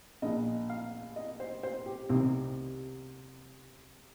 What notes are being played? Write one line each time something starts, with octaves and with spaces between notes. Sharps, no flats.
A#1 A#2 D#5
F5
D#5
C5
C5
G4
C2 C3 D#3 C4